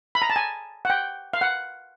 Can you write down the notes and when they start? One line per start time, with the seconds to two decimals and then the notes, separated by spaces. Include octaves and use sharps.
0.15 B5
0.22 A#5
0.30 A5
0.36 G#5
0.85 F#5
0.90 G5
1.33 F5
1.41 F#5